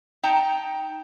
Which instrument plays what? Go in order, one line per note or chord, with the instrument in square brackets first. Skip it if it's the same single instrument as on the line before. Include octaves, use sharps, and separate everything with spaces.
[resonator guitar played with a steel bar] D#4 G5 A5 A#5